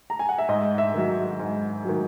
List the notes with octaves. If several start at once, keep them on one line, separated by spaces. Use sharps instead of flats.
A#5
G#5
F#5
E5
G#2 D#5
E5
D#3 F#3
E5
G#2
D#3 F#3